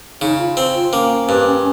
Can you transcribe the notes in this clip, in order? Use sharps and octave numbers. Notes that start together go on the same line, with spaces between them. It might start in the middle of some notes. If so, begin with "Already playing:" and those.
C#3 D#4
F4
C4
F4
A#3 C#4
G2